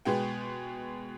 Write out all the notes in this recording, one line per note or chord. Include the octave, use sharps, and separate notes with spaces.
B2 G#3 B3 G5